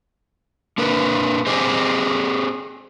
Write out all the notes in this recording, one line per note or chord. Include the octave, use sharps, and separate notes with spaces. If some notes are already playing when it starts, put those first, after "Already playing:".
A#3 D4 A#4 B4
C4 G4 G#4 C5 D#5